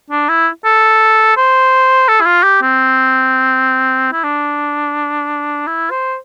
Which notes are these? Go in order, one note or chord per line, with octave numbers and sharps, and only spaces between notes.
D4
E4
A4
C5
A4
E4
F4
G4
C4
E4
D4
E4
C5